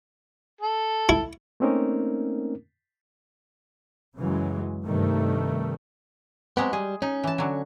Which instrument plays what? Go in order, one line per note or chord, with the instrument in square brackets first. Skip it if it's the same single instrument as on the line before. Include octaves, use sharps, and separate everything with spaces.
[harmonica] A4
[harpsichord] E4
[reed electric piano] A3 A#3 C4 C#4 D#4 A#4
[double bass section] F#2 C#3 E3 F#3 G#3
G2 C3 D#3 G3 A3
[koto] F#3 G#3 G4 [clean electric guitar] B3 C4
[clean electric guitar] G3 [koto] G#4
[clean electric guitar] C#4 [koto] D#4
[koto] E3 A5
D3 F#3